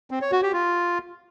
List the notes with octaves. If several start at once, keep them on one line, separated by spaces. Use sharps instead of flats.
C4
C#5
F#4
G4
F4